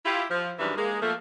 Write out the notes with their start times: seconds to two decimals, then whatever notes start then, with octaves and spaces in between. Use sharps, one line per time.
0.06 E4 F4 G4
0.31 F3
0.59 F#2 D#3 E3 G3 G#3 D4
0.77 G#3 A#3 G#4
1.02 F3 A3 A#3